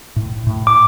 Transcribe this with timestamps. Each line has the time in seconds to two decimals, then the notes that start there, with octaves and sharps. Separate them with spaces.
0.16 A2
0.47 A2
0.67 D6